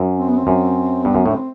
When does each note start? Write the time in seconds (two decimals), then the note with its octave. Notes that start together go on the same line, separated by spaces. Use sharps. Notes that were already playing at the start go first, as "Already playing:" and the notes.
Already playing: F#2
0.19 C4
0.29 B3
0.37 C4
0.47 F#2
1.04 G2 B3
1.15 F#2
1.26 A2
1.28 D4
1.34 C4